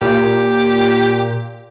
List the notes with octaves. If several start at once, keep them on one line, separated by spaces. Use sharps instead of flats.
A#2 G4